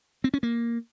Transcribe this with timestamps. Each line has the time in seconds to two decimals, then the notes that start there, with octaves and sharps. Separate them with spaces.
0.24 C4
0.34 C#4
0.43 A#3